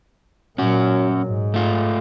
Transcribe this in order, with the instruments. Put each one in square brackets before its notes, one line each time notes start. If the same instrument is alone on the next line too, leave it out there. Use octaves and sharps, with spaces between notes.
[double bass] A#2 F#3 [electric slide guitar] C#4 F#4
[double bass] G#2
[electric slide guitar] A3 F4